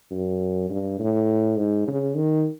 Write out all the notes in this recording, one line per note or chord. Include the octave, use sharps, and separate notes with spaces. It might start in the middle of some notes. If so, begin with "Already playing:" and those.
F#2
G2
A2
G#2
C#3
D#3